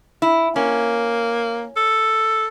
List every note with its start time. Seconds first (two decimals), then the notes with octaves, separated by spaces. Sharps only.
0.22 E4
0.56 A#3 C#4
1.76 A4